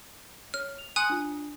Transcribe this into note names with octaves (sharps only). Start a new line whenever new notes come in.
C#5 F6
F7
G#5 C6 D#6 F#6 C#7 F#7
D4 F4